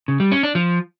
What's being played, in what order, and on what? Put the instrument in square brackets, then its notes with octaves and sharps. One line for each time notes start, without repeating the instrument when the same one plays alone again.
[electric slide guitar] C#3
G3
C#4
D4
F3